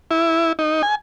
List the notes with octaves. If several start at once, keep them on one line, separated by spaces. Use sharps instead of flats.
E4
D#4
G#5